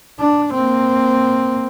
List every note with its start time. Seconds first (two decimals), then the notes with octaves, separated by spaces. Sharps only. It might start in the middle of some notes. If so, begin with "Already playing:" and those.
0.19 D4
0.54 A#3 C4